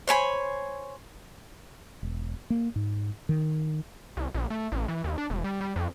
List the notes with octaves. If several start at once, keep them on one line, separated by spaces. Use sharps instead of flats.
C5 C#5 G#5 B5
E1
A#3
G#2
D#3
C2
A#1
A3
A1
E3
D#2
D4
E1
G3
G3
F2